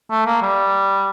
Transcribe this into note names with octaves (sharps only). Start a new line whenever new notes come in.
A3
A#3
G3